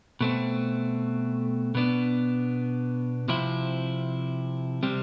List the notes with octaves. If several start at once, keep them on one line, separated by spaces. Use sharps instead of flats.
B2 A3 C4
B2 B3 D4
C3 F3 C4 E4
C3 G3 C4